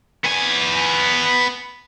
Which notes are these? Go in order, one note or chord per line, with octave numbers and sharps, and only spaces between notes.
B3 G#5